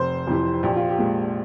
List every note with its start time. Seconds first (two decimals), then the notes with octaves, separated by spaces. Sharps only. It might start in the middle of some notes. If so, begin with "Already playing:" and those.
Already playing: F1 C5
0.27 F2 C3 E3
0.63 A#1 G4
0.76 F4
0.90 G4
0.98 A#2 G#3